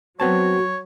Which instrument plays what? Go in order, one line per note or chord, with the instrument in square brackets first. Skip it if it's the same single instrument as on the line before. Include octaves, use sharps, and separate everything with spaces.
[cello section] F#3 [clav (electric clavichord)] B3 C4 A5 [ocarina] F#4 [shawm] C#5